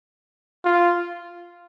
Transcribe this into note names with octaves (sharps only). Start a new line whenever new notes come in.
F4